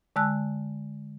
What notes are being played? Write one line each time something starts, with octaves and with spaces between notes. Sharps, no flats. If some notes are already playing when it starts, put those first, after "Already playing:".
D3 G#3 A5 E6 F#6